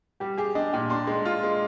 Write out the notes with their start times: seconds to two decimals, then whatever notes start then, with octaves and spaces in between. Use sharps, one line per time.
0.20 G3 G4
0.38 G4 G#4
0.55 D4 D#5
0.73 A#2 G5
0.90 D4 C6
1.07 G#3
1.25 F4
1.43 G#3